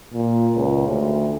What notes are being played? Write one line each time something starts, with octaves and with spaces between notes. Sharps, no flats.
A#2
C#2
D2